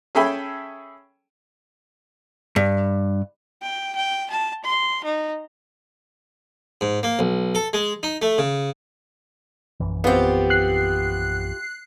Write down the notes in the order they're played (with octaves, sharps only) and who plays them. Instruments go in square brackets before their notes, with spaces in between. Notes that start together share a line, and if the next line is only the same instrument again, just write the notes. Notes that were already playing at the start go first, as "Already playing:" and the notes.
[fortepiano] C#4 G#4 A4 E5 G5 B5
[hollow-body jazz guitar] G2
[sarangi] G5
G5
A5
C6
D#4
[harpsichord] G#2
A#3
B1
A4
G#3
D#4
A3
C#3
[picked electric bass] A#1 F#2 E3
[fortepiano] B3 C4 [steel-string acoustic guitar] F4 G4
[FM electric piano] F#6 C7